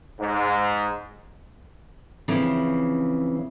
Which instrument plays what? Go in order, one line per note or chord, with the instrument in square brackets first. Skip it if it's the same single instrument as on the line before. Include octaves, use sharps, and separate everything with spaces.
[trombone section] G#2
[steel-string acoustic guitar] C#3 E3 F3 C4